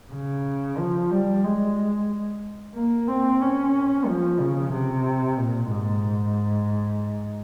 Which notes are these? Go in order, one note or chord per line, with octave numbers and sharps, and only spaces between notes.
C#3
F3
G3
G#3
A#3
C4
C#4
F3
C#3
C3
A#2
G#2